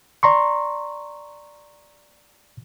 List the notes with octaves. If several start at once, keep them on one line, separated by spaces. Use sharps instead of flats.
D5 A#5 C6 C#6